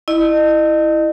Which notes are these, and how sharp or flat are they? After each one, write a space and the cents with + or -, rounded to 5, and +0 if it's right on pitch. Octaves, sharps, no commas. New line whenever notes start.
E4 +0 D#5 -35